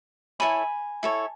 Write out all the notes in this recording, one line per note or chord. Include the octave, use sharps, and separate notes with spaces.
E4 A4 C#5 G#5 B5
E4 A4 C#5